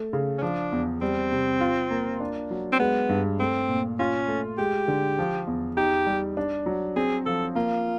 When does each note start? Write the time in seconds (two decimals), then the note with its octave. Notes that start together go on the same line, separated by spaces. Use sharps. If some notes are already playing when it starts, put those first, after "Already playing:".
Already playing: A3
0.13 C#3
0.38 C#4
0.42 F3 D4
0.72 E2
1.02 G3 C4
1.32 C3
1.61 F4
1.90 A#3
2.20 D4
2.51 F#3
2.73 C4
2.80 G#3 B3
3.09 G2
3.40 A3 C4
3.69 A#2
3.99 C#4 F4
4.28 A3
4.58 G#3 G4
4.88 D3
5.19 F3
5.47 E2
5.77 D#4 G4
6.07 G3
6.37 D4
6.66 F#3
6.96 C4 G#4
7.26 F3 A4
7.55 A#3 F4